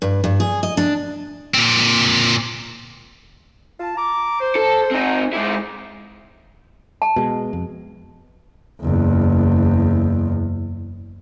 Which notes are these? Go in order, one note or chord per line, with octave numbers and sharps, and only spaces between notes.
G2
G2
G#4
D#5
D4
A#2 C4
F4 A5
A#5 D6
C5
A4
C4 D#4 F#5 G#5 A#5
G#2 G#3 D#4 E4 G4
A5
B2 G#3
F2
F#1 E2